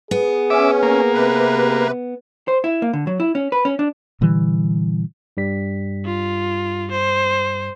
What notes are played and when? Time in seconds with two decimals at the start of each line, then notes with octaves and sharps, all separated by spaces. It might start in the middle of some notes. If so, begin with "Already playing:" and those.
0.11 B3 G#4
0.50 C#4 E5 D6
0.83 A#3
1.13 C3 B4
2.48 C5
2.64 E4
2.82 A#3
2.93 D3
3.07 F#3
3.20 E4
3.35 C#4
3.52 B4
3.65 C#4
3.79 D4
4.21 A#2 D3 E3 G3
5.37 G2 G3 B6
6.05 F4
6.91 C5